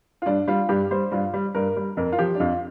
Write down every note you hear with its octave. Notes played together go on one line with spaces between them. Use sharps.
F4
G2 D4
G3 F4
G2 G4
G3 C5
G2 F4
G3
G2 A#4
G3
F2 A#4
F4
F3 G4
D4
F2 F4